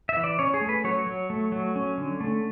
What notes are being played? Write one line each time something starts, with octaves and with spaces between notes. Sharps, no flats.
E5
E3
D5
C#4 C#5
G#4
A3
B4
F#3 C#5
F#3
A3
F#3
C#4
D3
A3